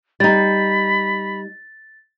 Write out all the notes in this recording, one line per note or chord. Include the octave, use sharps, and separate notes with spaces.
G3 D#4 B5 A6